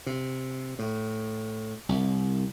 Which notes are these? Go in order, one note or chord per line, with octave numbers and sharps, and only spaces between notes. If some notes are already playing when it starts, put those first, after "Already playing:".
C3
A2
C2